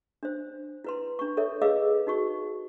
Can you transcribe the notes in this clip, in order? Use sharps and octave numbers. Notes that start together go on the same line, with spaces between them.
D4 C5
E4 B4 C6
D4 C#6
A4 A#4 C#5 E5
G#4 B4 D#5 F5 D6 E6
D#4 F#4 C#6